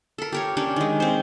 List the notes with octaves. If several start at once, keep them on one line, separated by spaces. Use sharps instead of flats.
A4 A#4
G4 A#4 C#5
C#4 D4 G4 A#4
D#3 G#3
C4 C5